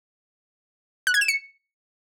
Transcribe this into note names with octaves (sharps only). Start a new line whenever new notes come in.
F#6
G#6
E7
C#7